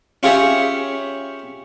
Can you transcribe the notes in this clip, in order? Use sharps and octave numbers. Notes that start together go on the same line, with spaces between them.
C#4 F4 G4 G#4 C#5 E5